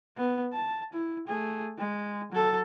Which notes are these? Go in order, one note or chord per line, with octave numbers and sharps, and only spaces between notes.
B3
A5
E4
A3 G#4
G#3
F#3 A4